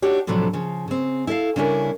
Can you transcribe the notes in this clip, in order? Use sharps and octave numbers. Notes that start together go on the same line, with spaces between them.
D4 D#4 F#4 G4 C#5
A2 C3 F3 F#3 A3 D4
C#3 F3
C#3 C4
E4 A4 E5 F5
C#3 G3 C#4 D4 E4 A#4